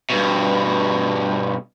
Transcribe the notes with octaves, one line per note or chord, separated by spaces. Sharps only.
G2 B2